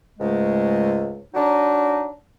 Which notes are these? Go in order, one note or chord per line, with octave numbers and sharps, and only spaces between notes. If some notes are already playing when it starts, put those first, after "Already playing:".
C#2 G#2 G#3 A3
F#3 D4 D#4